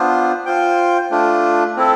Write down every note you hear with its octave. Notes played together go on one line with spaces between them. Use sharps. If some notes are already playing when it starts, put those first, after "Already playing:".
Already playing: B3 D4 F4 C5
F4 C5 G5
A3 D4 F4
C4 E4 A4